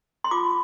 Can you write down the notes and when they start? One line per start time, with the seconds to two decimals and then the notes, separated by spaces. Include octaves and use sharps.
0.24 C6
0.31 F4 D6